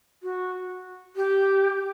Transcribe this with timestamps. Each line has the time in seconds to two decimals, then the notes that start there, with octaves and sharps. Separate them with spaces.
0.23 F#4
1.16 G4